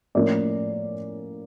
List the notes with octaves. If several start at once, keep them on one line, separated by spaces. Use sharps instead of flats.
A2 F3 A#3 C#4 D5